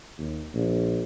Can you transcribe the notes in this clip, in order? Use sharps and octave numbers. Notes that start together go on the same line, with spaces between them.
D#2
A#1